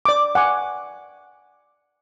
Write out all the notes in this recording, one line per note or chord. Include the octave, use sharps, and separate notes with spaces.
D5 D6
F#5 G#5 D6